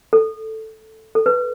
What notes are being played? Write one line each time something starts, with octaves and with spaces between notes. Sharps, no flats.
A4
A4
B4